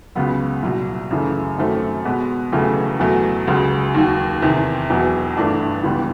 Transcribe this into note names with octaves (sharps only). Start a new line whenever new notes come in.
C#2 C#3 F#3 B3
C2 A#2 F#3
F#2 C#3 E3 A3
F#2 D#3 F#3 A3 C4
B2 G#3 B3
E1 E2 C#3 F#3 A3
E2 B2 F#3 A3
C#2 C#3 F#3
D#2 D#3 F#3
E2 C3 D#3
E1 E2 B2 F#3
G1 G2 E3 A3 D4
C#2 C#3 E3 G3 B3